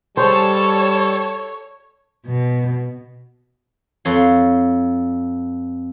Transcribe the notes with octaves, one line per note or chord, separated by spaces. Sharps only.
G3 G#4 A4 C5 C#5 A5
B2
F2 C#5 C6